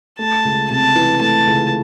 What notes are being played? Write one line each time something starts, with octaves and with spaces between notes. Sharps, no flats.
A3 A5
C#2
C3 A5
E3
A3 A5
C#2